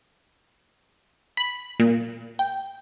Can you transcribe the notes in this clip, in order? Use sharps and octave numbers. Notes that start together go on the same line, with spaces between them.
B5
A#2
G5